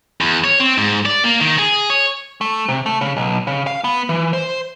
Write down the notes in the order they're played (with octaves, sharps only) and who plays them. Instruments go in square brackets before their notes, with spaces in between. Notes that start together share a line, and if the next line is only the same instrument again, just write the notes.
[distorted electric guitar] E2
C#5
C4
G#2
D5
A#3
D#3
G#4
C#5
[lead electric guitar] A3
C3
A3
C#3
B1
C#3
F5
B3
E3
C5